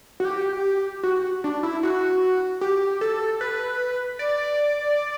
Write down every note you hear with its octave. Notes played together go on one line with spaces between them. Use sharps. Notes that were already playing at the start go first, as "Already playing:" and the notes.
F#4
G4
F#4
D4
E4
F#4
G4
A4
B4
D5